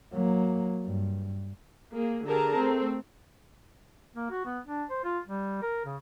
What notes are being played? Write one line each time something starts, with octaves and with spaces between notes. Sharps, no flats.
F#3 A#3
G2
A#3 G#4
D3 G4 G#4 A#4 A5 A#5
A3 C4
A#3
F#4
B3
D4
C5
F4
G3
A#4
C#3